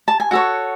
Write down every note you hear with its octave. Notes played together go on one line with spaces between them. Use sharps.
A5
G#5
F#4 A4 C#5 F#5